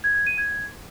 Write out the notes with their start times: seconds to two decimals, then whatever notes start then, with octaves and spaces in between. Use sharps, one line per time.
0.04 G#6
0.15 G#6
0.27 D#7
0.38 G#6